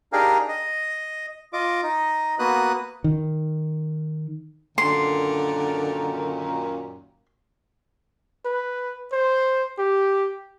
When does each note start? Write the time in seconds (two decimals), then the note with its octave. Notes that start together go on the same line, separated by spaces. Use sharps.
0.13 D4 D#4 G4 G#4 A#4 F5
0.48 D#5
1.53 F4 D#5 D6
1.83 D#4 D#5
2.39 A#3 B3 F#4 B4 D#6 F#6
3.04 D#3
4.78 F#2 A#2 D3 D#3 C6
8.45 B4
9.12 C5
9.78 G4